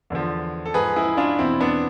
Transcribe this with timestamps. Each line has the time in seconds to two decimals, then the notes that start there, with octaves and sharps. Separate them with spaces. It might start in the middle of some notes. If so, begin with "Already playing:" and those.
0.10 E2 D3 F3
0.65 A4
0.74 G#2 F3 G#4 B4
0.96 E4 G#4
1.17 D4 F4
1.39 E2 B2 C4 E4
1.60 B3 D4